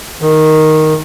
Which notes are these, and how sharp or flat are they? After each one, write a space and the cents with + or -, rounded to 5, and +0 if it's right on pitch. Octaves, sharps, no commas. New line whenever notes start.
D#3 +0